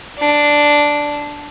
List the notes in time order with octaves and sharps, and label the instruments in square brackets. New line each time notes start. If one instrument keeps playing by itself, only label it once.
[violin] D4